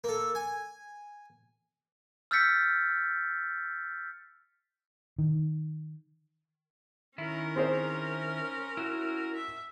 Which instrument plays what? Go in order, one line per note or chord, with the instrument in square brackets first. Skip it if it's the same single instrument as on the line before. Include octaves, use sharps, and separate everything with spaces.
[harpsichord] A#3 A4
G#5
[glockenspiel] E6 F6 G6 A6 B6 C#7
[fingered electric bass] D#3
[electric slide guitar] D#3 E4 [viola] C#4 A#4
[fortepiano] C4 G#4 C5
[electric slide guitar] E4 F#4
[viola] E5